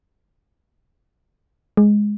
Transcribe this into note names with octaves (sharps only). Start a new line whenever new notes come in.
G#3